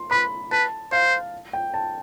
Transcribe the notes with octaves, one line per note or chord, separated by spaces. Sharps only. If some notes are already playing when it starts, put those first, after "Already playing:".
Already playing: C6
B4 B5
B4 A5
C5 F5
G5
A5